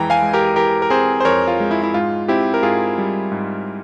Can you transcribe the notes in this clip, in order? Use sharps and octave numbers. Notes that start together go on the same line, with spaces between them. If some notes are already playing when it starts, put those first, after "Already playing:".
Already playing: F2 E3 G#3 G5 A#5
F5 G#5
G#3
G4 A#4
E3 G4 A#4
A#4
C4 G#4 C5
C5
F2 A#4 C#5
F4
G#3
E4
E4
G#2 F4
C4 E4 G4
A#4
G#2 F4 G#4
G3
G#2